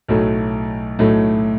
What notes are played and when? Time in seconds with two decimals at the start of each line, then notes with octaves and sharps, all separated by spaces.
0.08 B1 A2 F#3 A3
0.99 B1 A2 F#3 A3